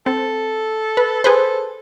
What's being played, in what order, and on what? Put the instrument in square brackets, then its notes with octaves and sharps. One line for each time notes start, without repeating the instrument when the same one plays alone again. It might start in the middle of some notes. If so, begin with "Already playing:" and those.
[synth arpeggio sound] C4 [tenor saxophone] A4
[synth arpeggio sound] B4
[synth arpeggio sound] G#4 B4 C5 [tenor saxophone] A4